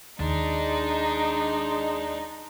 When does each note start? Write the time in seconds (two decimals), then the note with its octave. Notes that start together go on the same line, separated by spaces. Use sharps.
0.20 D#2 G#3 D4 D#4